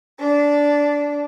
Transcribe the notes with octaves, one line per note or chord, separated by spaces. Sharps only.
D4